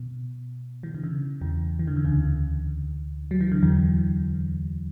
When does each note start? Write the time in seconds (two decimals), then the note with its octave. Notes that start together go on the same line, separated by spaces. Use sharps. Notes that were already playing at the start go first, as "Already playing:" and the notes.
Already playing: B2
0.83 E3
0.95 D3
1.04 C#3
1.41 E2 E3
1.79 E3
1.87 D3
1.96 C#3
2.05 D2 D3
3.31 F#3
3.41 E3
3.52 D3
3.62 E2 E3